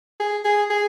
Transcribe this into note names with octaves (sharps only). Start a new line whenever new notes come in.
G#4
G#4
G#4